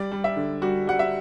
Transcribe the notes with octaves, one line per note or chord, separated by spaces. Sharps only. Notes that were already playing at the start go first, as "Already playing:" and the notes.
Already playing: G3 D5
G3
E5
D3
G3 F#4
G3 F#5
E5